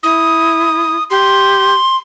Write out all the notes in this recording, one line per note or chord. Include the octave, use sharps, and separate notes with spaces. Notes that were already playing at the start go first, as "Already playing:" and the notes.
E4 D#6
G4 C6